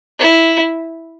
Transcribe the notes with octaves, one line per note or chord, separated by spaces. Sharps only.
E4